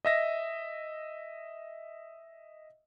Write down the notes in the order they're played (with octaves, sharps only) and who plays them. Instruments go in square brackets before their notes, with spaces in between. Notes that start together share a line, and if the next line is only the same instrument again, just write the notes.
[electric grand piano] D#5 E5 A#6